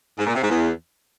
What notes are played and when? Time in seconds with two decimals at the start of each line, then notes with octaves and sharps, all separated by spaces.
0.19 G#2
0.27 A#2
0.34 C3
0.42 G#2
0.50 E2